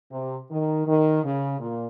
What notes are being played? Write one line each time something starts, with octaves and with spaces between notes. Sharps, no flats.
C3
D#3
D#3
C#3
A#2